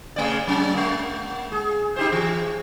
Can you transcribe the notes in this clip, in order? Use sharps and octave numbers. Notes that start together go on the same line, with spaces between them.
C#3 A3 D5
F#3 C#4
G#3 A#3
G#4
D#4 G4 C5
E3